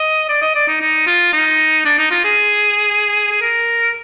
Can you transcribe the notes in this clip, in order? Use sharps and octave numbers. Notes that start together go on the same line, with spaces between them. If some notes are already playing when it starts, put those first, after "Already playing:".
Already playing: D#5
D5
D#5
D5
D#4
D#4
F4
D#4
D4
D#4
F4
G#4
G#4
A#4